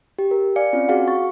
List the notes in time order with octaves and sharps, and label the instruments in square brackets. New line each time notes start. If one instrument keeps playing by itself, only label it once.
[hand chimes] G4
A#4
D5 F5 G#5 C#7
C4 C#4 F4
F#4 G#4 F5 F#5
C#6 A6